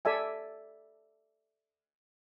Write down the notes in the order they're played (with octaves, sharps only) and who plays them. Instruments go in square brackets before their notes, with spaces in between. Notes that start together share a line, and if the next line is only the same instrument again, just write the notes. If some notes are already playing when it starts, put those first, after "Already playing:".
[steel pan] A4 D5 E5 G#5